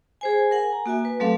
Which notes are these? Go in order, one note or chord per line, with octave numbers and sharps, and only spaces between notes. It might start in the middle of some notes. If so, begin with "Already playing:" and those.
G#4 C5 G#5
A#4 F#5 G#5
A#5
A#3 F#4 E5 G#5
B4
F#3 A3 C4 A4 F5